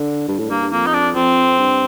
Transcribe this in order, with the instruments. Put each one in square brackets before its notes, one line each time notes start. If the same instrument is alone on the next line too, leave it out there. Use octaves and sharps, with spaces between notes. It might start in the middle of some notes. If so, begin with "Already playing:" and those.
Already playing: [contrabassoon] D3
G2
A2
[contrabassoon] G2 [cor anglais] A#3
[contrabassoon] G2
[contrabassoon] F2 [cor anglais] A#3
[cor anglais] D#4
D4
[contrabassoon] F2 [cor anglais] C4
[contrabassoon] G2